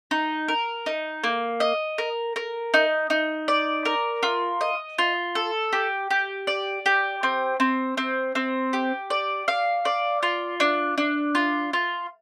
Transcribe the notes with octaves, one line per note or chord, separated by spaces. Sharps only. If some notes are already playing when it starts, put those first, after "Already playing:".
D#4
A#4
D#4
A#3
D#5
A#4
A#4
D#4
D#4
D5
A#4
F4
D#5
F4
A4
G4
G4
D5
G4
C4
C4
C4
C4
G4
D5
F5
D5
F4
D4
D4
F4
F4